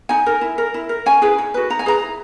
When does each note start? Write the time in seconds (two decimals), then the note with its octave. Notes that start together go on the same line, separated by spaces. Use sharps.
0.09 D#4 G#5
0.26 A#4
0.41 E4
0.58 A#4
0.74 E4
0.89 A#4
1.06 C#4 G#5
1.22 E4 G#4 B4
1.38 D#4
1.54 F#4 B4
1.70 D#4 A#5
1.79 G#5
1.86 G#4 B4 A#5
2.01 E4